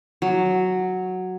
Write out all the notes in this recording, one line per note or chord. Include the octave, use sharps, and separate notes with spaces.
F#3